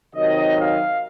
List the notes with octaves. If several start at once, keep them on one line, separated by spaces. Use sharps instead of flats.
C3 D#3 F#3 D#5
F5